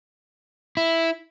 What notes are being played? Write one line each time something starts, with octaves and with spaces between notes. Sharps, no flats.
E4